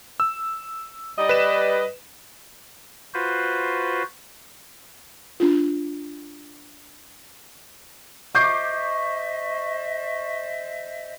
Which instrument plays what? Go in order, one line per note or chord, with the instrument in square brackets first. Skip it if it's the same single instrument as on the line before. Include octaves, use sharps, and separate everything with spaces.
[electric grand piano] E6
[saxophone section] G3 D5 D#5
[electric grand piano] B4 E7
[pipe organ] F4 F#4 B4 C5
[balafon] D4 F4
[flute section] C5 D#5 E5 [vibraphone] C#6 [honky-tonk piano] D6 G6 C7